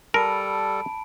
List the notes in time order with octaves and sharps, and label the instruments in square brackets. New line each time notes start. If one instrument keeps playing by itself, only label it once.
[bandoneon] G3 A4 [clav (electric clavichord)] A#4 [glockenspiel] A5 B5 D7